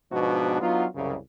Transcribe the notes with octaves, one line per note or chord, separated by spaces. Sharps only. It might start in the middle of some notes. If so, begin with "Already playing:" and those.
G#2 B2 F3 B3 D4 F#4
F#3 B3 D4 D#4 F4
C2 F#2 C#3